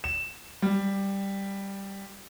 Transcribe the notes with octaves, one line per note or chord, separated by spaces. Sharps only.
E7
G3